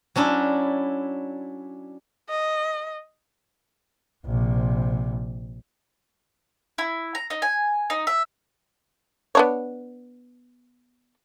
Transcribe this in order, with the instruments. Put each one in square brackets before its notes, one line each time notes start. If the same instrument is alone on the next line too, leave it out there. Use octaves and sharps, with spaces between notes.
[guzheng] F#3 C#4 D4 E4
[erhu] D#5
[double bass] A#1 C3
[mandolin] E4
A#5
D#4
G#5
D#4
E5
[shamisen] B3 D4 C#5